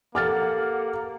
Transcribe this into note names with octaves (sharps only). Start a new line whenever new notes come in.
A#3 G4 A4 F#5 D6 F6 A6